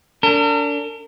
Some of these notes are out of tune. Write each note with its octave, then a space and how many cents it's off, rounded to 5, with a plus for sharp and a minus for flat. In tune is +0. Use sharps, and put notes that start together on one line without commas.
D4 -30 A#4 -40